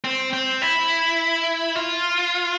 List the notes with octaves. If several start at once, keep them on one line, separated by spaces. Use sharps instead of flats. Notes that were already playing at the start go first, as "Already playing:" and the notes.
C4
C4
E4
F4